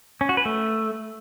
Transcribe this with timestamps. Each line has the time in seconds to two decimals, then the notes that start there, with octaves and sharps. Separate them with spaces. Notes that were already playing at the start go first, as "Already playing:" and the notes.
0.21 C#4
0.29 F#4
0.37 B4
0.45 A3